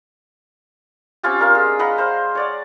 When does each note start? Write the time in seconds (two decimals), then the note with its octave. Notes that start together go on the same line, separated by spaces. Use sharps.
1.23 C4 C#4 F4 G4
1.39 D4 A#4 F5
1.55 G#3
1.79 B4 D#5 F#5 A#5
1.98 C5 F5
2.35 C#5 D5 F#5